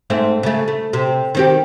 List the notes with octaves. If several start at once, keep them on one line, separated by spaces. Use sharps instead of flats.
G#2 A3 C4
C#3 A3
A3
C3
D#3 C4 G4